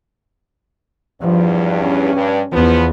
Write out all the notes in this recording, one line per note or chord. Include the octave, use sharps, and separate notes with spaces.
E2 G2 F3
C#4
G2
E2 F3 B3